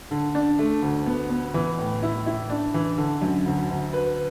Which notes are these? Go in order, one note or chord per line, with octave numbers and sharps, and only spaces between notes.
D3
D4
A3
D2
B3
B3
E3
A2
E4
E4
D4
E3
D3
F#2
D2
D2
B4